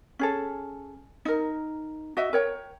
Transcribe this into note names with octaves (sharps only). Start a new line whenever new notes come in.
C#4 G#4 A4
D#4 A#4
F#4 D#5 E5
A#4 C#5 G5